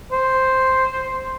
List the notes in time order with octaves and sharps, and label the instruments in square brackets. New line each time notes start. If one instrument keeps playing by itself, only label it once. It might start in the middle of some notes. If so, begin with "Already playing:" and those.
[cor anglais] C5